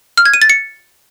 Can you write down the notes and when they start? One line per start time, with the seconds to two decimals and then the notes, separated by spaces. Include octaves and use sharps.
0.18 F6
0.26 G#6
0.34 D#7
0.42 A6
0.50 C#7